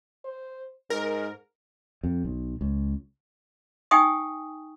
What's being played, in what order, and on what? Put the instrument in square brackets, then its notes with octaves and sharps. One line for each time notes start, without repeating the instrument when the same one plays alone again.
[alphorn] C5
[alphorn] G#2 [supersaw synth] A#4
[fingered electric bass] F2
B1
C#2
[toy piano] D#4 G5 G#5 C#6 D#6